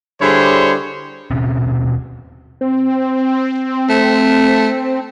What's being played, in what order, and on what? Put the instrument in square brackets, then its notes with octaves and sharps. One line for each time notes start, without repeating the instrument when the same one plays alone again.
[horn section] D3 G3 E4 G#4 C5 C#5
[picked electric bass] D#1 B2 C4 C#4
[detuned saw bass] C4
[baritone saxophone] A3